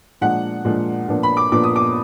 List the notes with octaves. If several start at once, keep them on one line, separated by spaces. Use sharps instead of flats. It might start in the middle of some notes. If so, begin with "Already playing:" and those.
A#2 F3 G#3 D4 F#5
A#2 F3 G#3 D4
A#2 F3 B3 D4
B5
D6
A#2 F3 B3 D4 D6
D#6
D6